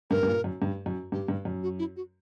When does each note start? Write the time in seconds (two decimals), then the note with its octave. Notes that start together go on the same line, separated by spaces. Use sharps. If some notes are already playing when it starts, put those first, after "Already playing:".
0.11 G2 A#4
0.23 G2
0.27 A#2
0.44 F#2
0.62 G2
0.86 F#2
1.12 G2 G4
1.28 G2
1.45 F#2
1.63 F#4
1.79 E4
1.96 F#4